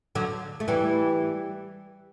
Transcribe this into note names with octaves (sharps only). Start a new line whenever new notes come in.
D3 F#3
A3
E3 G3